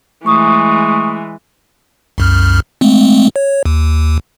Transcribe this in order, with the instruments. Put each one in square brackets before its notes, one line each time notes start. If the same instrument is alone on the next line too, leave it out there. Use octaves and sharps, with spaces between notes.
[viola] E3 G#3 [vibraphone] A3 C#6 D#6
[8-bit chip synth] C2 F#2 F6
G#3 A3 C4
C#5
D#2